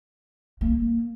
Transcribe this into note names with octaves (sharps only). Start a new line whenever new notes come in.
A#3